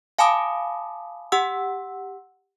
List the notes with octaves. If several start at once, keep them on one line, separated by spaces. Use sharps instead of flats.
F5 G#5 A5 B5 D6 D#6
G4 F#5 E6